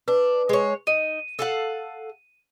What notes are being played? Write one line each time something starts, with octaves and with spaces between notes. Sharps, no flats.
D4 B4
G#3 C#5
D#4 D#7
A4 F5 F#5